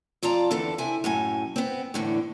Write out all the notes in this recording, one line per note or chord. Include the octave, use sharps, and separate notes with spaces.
F2 F4 D5 A5 A#5
E2 D3 A4 A5
C3 E4 E5 G#5
F#2 A2 G#5
B3 C4
E2 A2 D3